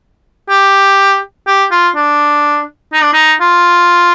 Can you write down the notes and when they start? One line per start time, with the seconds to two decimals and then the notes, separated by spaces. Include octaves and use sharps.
0.50 G4
1.47 G4
1.71 F4
1.95 D4
2.93 D#4
3.03 D4
3.13 D#4
3.41 F4